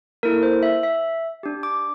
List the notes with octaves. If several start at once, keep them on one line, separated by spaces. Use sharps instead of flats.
A#3 E4 A4 A#4
C5
E5
E5
D4 G4
D6